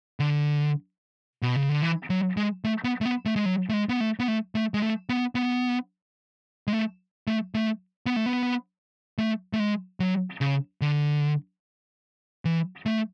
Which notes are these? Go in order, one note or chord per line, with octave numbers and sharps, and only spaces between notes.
D3
B2
C#3
D3
E3
F#3
G#3
A3
B3
A3
B3
A3
G#3
F#3
A3
G#3
B3
A3
B3
A3
A3
G#3
A3
B3
B3
G#3
A3
A3
A3
B3
A3
B3
A3
A3
G#3
F#3
C#3
D3
E3
A3